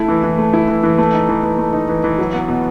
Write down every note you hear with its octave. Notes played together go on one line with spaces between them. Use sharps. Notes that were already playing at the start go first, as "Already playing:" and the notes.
Already playing: A3 E4
E3
E3
A3
E4
E3
E3
A3
D#4
E3
E3
A3
D#4
E3
E3
F#3
B3
B2